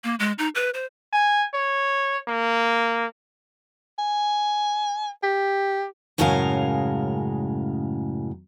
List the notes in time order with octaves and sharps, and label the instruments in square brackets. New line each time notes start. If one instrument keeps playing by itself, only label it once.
[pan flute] A#3
G#3
D#4
B4
C5
[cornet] G#5
C#5
A#3
[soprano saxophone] G#5
G4
[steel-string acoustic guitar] F#2 A2 C#3 G#3 A#4 F5